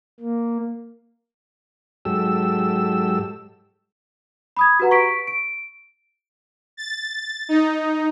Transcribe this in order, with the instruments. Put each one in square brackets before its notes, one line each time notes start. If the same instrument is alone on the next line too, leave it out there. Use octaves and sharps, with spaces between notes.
[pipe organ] A#3
[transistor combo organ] G#2 F#3 G4 A4 E6
[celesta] B5 D#6 G#6
F#4 G4 B4 F#5 A#5
C#6 B6 D7
D7
[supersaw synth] A6
D#4